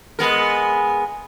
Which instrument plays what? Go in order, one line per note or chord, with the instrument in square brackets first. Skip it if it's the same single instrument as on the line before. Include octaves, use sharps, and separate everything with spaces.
[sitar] G#3 B3 A#4